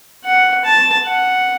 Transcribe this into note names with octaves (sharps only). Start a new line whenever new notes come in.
F#5
A5
F#5